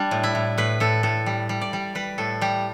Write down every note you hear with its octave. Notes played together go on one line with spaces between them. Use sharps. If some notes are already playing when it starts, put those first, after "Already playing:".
Already playing: G3 D4
A2
E4
A2
A2 B4
A2 A4
A2 A4
G3
G3
D5
G3
G3 B4
A2 A4
G3 G4